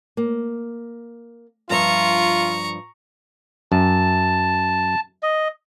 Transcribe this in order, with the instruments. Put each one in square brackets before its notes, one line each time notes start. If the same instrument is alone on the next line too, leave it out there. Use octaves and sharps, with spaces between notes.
[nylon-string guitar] A#3
[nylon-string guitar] G2 F3 E5 [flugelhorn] F4 [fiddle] A#5 C#6
[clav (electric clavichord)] F#2 [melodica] A5
[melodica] D#5